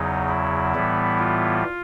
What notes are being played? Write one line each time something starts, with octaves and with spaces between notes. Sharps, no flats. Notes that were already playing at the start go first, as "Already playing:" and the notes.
Already playing: E2 C#3 F#3 D#4
E4
A2 E3 G3 B3
F4